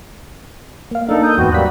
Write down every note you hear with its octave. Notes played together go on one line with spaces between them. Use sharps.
A#3 F5
A#3 D4 D#4 A4
D#6 G6
E2 G#2 B3 C4 F#4
F#3 G3 A#3 F#6 B6